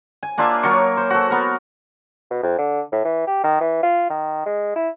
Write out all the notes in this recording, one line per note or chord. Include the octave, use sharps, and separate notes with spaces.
G#5
A#3 D4 F4 E5
F#3 A#4 C#6
C5
F#4 A4
B3 A#4
B2
F2
D3
A2
E3
G4
D#3
E3
F4
D#3
G#3
E4